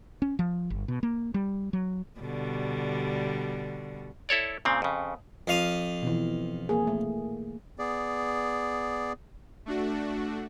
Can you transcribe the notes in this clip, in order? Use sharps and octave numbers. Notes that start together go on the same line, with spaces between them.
C#4
F3
G1
B2
A#3
G3
F#3
B2 D3 G3
E4 A4 C#5 D5
A#2 C#3 C4
F2 C#3
F2 F5 D#6
B2 E3
A#3 G#4
A3
B3 G#4 D5
A3 D4 F#4